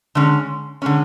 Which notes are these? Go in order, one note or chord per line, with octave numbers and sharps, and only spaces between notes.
D3 G#3 C#4
D3 G#3 C#4